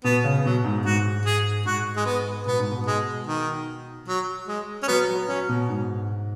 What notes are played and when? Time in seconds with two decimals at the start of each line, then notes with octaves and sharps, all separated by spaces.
0.04 B2 B3
0.24 C#3
0.45 B2 F#3
0.64 G#2
0.85 G#2 F#4
1.25 G#4
1.65 G#2 F#4
1.96 G#3
2.05 B3
2.46 B2 B3
2.59 G#2
2.71 B2
2.86 G#3
3.27 D#3
4.08 F#3
4.47 G#3
4.83 C#4
4.88 F#3 B3
5.08 F#3
5.28 F#3 C#4
5.49 B2
5.69 G#2